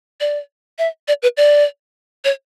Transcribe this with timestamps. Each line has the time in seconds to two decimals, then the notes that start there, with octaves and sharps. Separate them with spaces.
0.20 D5
0.79 E5
1.08 D5
1.22 B4
1.37 D5
2.25 C#5